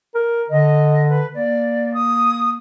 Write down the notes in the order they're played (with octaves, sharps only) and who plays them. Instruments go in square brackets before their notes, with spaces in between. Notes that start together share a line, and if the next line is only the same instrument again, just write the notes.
[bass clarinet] A#4
[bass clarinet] D3 [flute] D#5
[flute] B4
[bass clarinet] A#3 [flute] D5
[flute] D#6